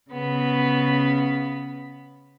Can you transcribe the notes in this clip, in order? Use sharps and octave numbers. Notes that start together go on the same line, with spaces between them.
C#3 B3 B5